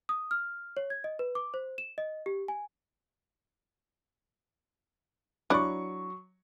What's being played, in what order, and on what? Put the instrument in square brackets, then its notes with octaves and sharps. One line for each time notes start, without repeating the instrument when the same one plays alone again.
[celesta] D#6
F6
C#5
G#6
D#5
B4
D6
C5
E7
D#5
G4
G#5
[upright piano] F#3 C#6 [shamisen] D4 E4 D5